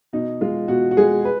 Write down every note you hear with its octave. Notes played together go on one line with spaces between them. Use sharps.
B2 D#4
G#3 F4
B2 F#4
F#4
G#3 G#4
B4